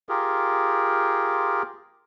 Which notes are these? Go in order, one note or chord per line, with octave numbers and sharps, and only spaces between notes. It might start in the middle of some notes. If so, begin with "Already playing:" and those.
F4 G4 G#4 A#4